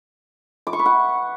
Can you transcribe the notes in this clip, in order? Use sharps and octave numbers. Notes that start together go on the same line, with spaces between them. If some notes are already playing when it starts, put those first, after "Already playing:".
D6
C#6
B4
F#5